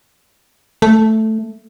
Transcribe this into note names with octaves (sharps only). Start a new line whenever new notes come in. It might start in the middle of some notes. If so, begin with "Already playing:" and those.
A3